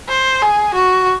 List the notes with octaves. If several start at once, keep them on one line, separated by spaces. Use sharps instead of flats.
C5
G#4
F#4